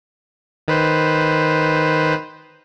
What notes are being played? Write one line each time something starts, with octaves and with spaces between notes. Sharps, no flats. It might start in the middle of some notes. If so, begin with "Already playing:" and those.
D#3 B4 C5